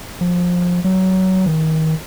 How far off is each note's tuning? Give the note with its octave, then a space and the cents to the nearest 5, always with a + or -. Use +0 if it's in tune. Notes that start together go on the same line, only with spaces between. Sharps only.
F3 +20
F#3 +20
D#3 +30